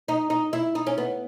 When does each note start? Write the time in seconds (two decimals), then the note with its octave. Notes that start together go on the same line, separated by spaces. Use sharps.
0.08 D#4
0.30 D#4
0.53 E4
0.75 D#4
0.87 C#4
0.98 B3